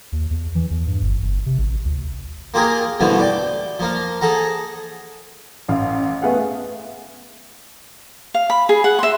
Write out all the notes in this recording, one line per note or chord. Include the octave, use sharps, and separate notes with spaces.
D#2
E2
E3
E2
G2
G1
F#1
C3
A1
D2
A#3 F4 G4 G#4 A#4
G2 B2 D3 E3 F3 A3
D5 G5
F3 A#3 F5
G#4 A4 F#5 A#5
A1 F5
A3 B3 G#4 F5 F#5
F5
B5
G#4
F#5
E5 C6